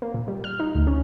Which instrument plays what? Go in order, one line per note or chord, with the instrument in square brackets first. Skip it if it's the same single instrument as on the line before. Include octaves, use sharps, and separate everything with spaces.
[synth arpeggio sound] A#3
A#2
G3
F6
D#4
D2
C#4